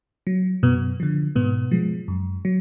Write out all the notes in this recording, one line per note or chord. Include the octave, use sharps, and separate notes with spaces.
F#3
F#2 B2 B3
D3 F3
G#2 B2 B3
F3 G#3
F#2
F#3